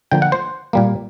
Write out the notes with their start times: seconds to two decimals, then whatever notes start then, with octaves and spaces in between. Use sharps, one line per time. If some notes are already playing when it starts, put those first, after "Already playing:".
0.11 D3 F3 A#3 G5
0.22 F#5
0.32 C5
0.73 A#2 G3 A#3